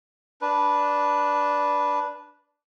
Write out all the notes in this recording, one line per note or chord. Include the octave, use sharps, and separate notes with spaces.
D4 B4